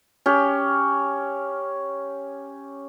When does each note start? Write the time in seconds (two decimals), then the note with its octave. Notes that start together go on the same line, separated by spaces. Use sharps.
0.26 C#4 G4